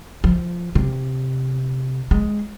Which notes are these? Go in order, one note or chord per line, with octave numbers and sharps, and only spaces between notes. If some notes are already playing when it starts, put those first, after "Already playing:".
F3
C3
G#3